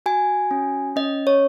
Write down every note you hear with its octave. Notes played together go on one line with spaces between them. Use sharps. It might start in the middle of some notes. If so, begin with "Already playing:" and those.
F#4 G#5
C#4
C#4 D#5
C#5